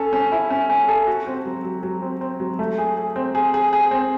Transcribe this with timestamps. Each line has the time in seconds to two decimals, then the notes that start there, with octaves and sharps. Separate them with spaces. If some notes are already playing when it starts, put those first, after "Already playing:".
Already playing: C#4 A4
0.13 C#4
0.32 E4
0.50 C#4
0.70 C#4
0.88 A4
1.07 F#4
1.27 C4
1.45 F#3
1.64 F#3
1.83 F#3
2.02 C4
2.21 C4
2.40 F#3
2.59 A3
2.78 G#4
2.97 G#4
3.16 C4
3.35 G#4
3.54 G#4
3.73 G#4
3.91 C4